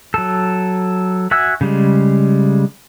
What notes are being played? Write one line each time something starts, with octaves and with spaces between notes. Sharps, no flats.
F#3 A4
F#4 E5 F#5 G#5 E6
C#3 G3 G#3